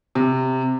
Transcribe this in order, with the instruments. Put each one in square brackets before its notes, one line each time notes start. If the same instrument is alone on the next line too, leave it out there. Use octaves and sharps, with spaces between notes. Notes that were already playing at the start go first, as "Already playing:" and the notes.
[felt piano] C3